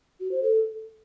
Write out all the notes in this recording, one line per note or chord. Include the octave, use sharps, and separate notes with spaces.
F#4
C5
A4